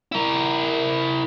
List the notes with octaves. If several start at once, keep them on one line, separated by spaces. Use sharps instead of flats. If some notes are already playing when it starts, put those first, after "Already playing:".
E4 A#4